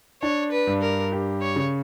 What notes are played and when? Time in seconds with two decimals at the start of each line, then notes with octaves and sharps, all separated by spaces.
0.22 D4 C#5
0.51 B4
0.67 G2
0.82 A#4
1.12 G4
1.41 C#5
1.56 C#3